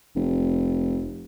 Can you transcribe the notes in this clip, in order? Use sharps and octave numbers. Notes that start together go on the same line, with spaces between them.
F1